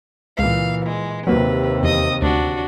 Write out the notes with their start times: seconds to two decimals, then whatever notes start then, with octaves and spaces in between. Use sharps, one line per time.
0.39 C#2 A#2 E3 F5
0.86 G#3
1.27 D#2 C3 F#3 A#3 B4
1.83 E2 D#5 D#6
2.22 D2 D4 F#4